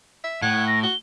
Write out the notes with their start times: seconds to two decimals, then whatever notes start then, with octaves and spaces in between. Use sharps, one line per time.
0.24 E5
0.42 A2 F#5 G#6
0.67 A#6
0.83 F#4 G7